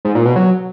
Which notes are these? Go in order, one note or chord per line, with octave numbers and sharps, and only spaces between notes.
G#2
A#2
B2
F#3